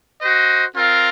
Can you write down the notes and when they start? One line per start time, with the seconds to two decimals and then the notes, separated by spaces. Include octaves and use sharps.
0.19 F#4 C5 D#5
0.75 C4 F4 A#4 F5